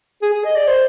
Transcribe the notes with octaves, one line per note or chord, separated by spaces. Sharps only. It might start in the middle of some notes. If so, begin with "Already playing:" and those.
G#4
G#4
D#5
D5
C5